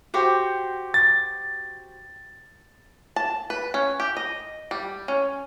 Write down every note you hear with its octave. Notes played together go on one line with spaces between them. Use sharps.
F#4 G4 C5
A6
A5
B4
C#4
G4
D#5
G3
C#4